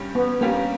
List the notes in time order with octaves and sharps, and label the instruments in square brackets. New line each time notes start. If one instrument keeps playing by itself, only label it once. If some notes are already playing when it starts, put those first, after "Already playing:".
Already playing: [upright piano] G2 G3 C#4 G4
[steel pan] B3
[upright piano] G2 G3 C#4 G4 [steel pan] A#3